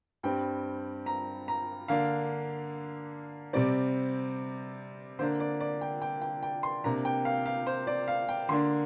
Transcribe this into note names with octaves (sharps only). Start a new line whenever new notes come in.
G2 G3 C4 G5
A#5
A#5
D3 A#3 D4 F5
C3 G3 C4 D5
D3 A#3 D4 C5
D5
D5
G5
G5
G5
G5
C6
C3 A#3 D4 A#5
G5
F5
F5
C5
D5
F5
G5
D3 A#3 D4 C6